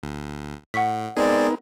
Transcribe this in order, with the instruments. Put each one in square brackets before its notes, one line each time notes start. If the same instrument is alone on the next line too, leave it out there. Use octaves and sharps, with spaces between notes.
[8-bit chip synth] D2
[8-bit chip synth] A2 [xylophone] F#5 C#6 B6
[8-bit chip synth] G#3 C4 G#4 [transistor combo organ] B3 D#4 A#4 [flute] D5